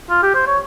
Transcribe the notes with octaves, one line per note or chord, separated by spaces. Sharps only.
F4
G4
C5
C#5